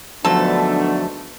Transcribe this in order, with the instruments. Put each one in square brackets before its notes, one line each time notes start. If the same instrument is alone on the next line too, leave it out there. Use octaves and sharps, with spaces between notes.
[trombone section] G#2 A3 [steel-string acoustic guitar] D3 F3 F#3 [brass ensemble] B3 D4 [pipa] A4